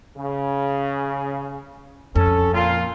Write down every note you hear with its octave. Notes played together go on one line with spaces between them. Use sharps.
C#3
F2 C#4 A4
A#2 F4